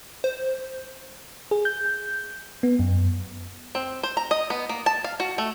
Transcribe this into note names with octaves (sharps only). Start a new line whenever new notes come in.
C5
G#4
G6
B3
F#2
C4
C5
A#5
D#5
B3
A#3
A5
F5
F#4
A3